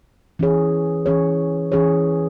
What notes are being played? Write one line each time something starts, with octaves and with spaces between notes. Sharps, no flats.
E3 C#4 G#4 C#5
E3 C#4 G#4 C#5
E3 C#4 G#4 C#5